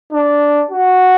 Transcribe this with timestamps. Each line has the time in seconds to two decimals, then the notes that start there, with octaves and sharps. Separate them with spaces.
0.12 D4
0.71 F#4